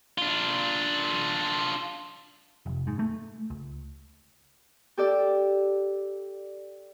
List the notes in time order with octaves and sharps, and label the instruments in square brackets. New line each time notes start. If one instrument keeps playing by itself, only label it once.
[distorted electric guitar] D4 F4
[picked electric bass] F1
G#2
A3
C#2
[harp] G4 A4 D5